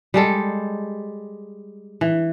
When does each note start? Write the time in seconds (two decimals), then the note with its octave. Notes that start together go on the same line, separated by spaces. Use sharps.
0.14 G3 G#3 A4
2.01 E3